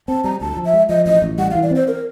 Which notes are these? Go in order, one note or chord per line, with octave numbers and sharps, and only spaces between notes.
C4 A5
G3 A#5
D2 A5
F3
E5
G#3
F3 D#5
A1 D#5
A1
G3 F#5
F5
E3
D5
C4 C5
A#4